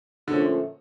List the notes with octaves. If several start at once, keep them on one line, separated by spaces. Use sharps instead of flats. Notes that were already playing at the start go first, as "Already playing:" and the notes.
A#2 D3 F3 A3 C#4 F4